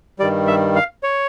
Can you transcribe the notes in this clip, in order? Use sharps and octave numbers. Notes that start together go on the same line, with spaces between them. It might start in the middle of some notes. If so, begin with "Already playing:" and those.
G2 D#3 G3 D5
E5
F5
C#5